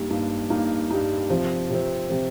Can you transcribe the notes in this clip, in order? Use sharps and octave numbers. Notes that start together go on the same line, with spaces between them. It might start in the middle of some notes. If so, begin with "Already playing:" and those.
Already playing: G2 G3 A#3 D#4
G2 G3 A#3 D#4
G2 G3 A#3 D#4
G2 G3 A#3 D#4
C3 F3 C4
C3 F3 C4
C3 F3 C4